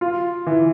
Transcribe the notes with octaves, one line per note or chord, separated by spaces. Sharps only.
F4
E3